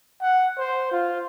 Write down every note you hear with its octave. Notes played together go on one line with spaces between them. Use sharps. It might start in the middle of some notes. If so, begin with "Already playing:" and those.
F#5
C5
F4